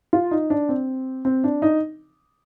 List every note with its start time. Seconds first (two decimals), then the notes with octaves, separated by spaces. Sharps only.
0.13 F4
0.31 D#4
0.50 D4
0.69 C4
1.25 C4
1.44 D4
1.62 D#4